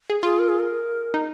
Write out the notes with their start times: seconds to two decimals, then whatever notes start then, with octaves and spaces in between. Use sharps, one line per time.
0.10 G#4
0.23 F4 G#4
0.39 A#4
0.49 G#4
0.59 A#4
1.14 D#4